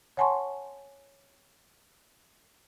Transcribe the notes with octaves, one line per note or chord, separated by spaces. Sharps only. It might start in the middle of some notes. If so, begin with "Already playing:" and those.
C#5 F#5 G#5 A5 C6 C#6